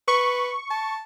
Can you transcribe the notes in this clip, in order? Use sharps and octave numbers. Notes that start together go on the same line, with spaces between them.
B4 C#6
A5